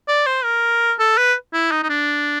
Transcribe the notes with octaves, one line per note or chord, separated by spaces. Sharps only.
D5
C5
A#4
A4
B4
E4
D#4
D#4
D4